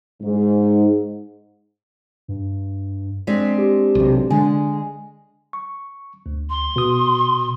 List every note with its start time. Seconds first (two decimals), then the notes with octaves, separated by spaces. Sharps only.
0.22 G#2
2.28 G2
3.27 G#3 C4 D4 B6
3.58 G4
3.95 B1 C3
4.30 D3 G#3 G#5
5.53 C#6
6.26 D2
6.50 C6
6.76 B2 D#6